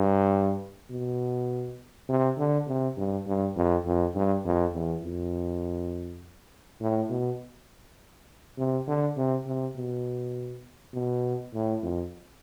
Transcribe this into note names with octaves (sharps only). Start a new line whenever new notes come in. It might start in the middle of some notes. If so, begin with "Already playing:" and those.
Already playing: G2
B2
C3
D3
C3
G2
G2
F2
F2
G2
F2
E2
F2
A2
B2
C3
D3
C3
C3
B2
B2
A2
F2